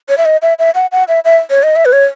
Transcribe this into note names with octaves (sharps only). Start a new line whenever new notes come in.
C#5
E5
D#5
E5
E5
F#5
F#5
E5
E5
C#5
D#5
E5
B4
C#5